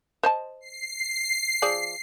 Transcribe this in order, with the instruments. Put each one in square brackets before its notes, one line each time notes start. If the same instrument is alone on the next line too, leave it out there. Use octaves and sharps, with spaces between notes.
[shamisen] C5 D#5 A5
[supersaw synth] C7
[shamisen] F3 G#4 D5